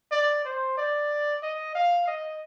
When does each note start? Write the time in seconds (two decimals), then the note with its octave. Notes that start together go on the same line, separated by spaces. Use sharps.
0.12 D5
0.45 C5
0.77 D5
1.43 D#5
1.75 F5
2.07 D#5